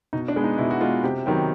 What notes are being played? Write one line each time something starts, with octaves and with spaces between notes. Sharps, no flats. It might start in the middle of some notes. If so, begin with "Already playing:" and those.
B2 D#4
D4
G#3 B3
D#4
B2 E4
F#4
G#3 B3 F4
C3 G4
D#3 F#3 B3 G4